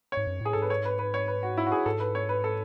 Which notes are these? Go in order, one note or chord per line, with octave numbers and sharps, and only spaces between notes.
G#2 C#5
F#2
A2 G#4
G#2 A4
B4
C#5
B4
B4
C#5
B4
F#4
E4
F#4
G#4
G#2 A4
B4
C#5
B4
A4